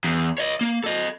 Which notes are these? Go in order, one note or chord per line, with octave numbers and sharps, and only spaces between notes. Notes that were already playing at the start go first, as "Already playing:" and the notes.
E2
C#5 D#5
A#3
A4 D#5